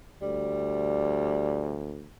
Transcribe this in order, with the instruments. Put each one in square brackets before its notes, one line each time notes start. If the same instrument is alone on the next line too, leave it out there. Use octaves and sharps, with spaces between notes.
[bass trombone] D2 [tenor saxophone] G3